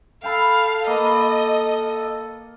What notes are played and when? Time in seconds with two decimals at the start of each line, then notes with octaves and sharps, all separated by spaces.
0.23 A4 F5 G5 A5 B5
0.87 A#3 D#5 B5